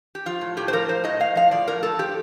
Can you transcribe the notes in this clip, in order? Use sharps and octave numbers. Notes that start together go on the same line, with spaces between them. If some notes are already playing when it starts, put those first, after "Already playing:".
G4
F3 F4
A2
A2 G4
C5
F3 A#4
F3 C5
A2 D#5
A2 F5
F3 F5
F3 D5
A2 A#4
A2 A4
F3 G4